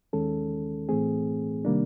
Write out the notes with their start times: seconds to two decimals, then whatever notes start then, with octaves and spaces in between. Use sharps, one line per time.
0.13 D#2 D#3 G#3 C#4 A4
0.89 A2 E3 A3 C4 G#4
1.65 C3 D#3 G3 A#3 D4